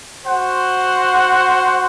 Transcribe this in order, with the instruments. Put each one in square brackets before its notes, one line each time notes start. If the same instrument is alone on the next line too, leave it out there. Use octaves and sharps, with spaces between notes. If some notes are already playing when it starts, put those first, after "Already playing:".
[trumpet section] F#4 C5 F#5